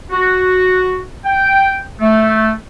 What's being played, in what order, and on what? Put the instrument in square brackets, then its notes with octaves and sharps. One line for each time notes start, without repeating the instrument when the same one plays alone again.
[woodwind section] F#4
G5
A3